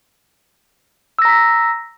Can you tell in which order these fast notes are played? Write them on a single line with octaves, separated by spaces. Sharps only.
E6 A#6 A#5 B6